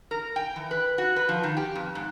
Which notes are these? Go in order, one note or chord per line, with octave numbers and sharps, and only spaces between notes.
A#4
G5
E3
B4
F#4
B4
F3
D#3
G4
F2
G#2